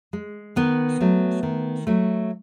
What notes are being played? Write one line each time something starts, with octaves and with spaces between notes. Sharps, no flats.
G#3
D#3 B3
F#3 A3
D#3
F#3 A3